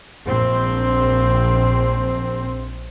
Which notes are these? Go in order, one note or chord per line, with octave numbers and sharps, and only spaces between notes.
A#1 C4